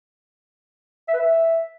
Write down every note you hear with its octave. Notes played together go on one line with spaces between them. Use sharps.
E5
B4
E5